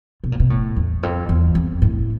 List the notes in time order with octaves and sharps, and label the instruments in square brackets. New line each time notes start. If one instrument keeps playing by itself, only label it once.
[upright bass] B2
A#2
B2
A2
E2
F2
E2
F2
A2